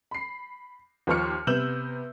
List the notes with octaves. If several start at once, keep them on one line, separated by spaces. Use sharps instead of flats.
B5 C7
D#2 F3 C5 C#6 F6 C#7
C3 B3 E6 G6 E7 F#7